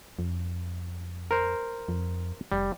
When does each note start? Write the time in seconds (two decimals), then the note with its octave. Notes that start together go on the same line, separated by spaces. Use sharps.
0.19 F2
1.31 A#4 C5
1.88 F2
2.52 F1 G3